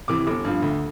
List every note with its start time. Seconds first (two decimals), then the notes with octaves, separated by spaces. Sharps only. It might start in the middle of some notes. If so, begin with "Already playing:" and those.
0.08 C3 E3 D6
0.27 G1 D6
0.45 G2 F3
0.62 D2